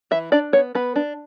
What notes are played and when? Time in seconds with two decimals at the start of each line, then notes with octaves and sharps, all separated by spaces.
0.11 E3 E5
0.32 D4 D5
0.53 B3 C#5
0.75 B3 B4
0.96 D4